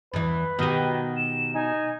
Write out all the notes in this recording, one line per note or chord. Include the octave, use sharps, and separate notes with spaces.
E2 E3 B4
B2 D#3 F#4 G4 D#5
E7
D#4 G#5